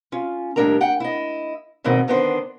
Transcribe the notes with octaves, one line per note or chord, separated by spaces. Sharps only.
C#4 F4
D#2 A2 G3 D4 A#4 A#5
F#5 G5
E4 D#5
E2 G#2 B2 D#3 C4
D3 D#3 B3 D4 F4 C5